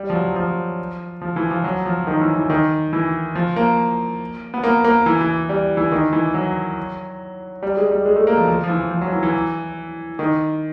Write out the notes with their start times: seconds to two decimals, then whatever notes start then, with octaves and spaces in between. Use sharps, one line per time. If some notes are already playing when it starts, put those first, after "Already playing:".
Already playing: G3
0.10 F3
0.15 F#3
0.36 F3
1.21 F3
1.36 E3
1.51 F3
1.64 F#3
1.86 F3
2.07 D#3
2.21 E3
2.36 E3
2.50 D#3
2.93 E3
3.35 F3
3.56 A#3
4.54 B3
4.64 A#3
4.84 A#3
5.06 E3
5.21 E3
5.49 G3
5.77 E3
5.92 D#3
6.13 E3
6.34 F#3
7.62 G3
7.77 G#3
7.91 G3
8.05 G#3
8.16 A3
8.27 A#3
8.38 F3
8.48 F3
8.64 F3
8.69 E3
8.91 F3
9.01 F#3
9.12 E3
9.23 E3
10.19 D#3